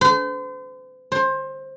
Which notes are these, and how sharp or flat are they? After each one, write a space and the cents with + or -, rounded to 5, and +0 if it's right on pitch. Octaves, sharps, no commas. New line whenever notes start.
C5 -40
C5 +20